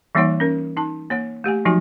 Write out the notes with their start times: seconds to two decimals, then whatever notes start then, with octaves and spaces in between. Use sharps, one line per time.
0.15 E3 G3 A#3 D#4 C#5 F#5
0.40 C#4 A#4
0.77 D#4 A5
1.10 A#3 C#5 F#5
1.44 A3 G4 F#5 G#5
1.65 F3 F#3 D#4 F#4 G#5